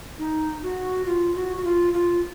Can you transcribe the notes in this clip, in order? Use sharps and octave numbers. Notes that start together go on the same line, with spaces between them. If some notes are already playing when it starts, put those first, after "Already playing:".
D#4
F#4
F4
F#4
F#4
F4
F4